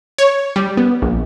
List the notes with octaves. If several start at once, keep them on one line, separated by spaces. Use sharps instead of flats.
C#5
G3
B3
A#1